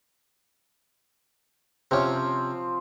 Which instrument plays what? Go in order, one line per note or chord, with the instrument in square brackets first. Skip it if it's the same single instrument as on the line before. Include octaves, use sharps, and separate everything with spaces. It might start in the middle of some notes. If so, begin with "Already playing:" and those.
[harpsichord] C3 C#4 [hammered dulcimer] F3 C4